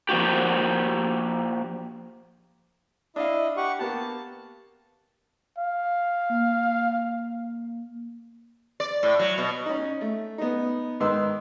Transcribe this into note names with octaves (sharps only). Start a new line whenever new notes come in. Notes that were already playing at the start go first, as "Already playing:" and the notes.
F3 A#3 F#4 G4
D4 E4 D#5 F5
G4 F#5 C#6
A#3 B3 G4 A5
F5
A#3
D5
A2
F#3
B2
C#4 D#4
A3
B3 D#4
G#2 D#3 B4 C6 E6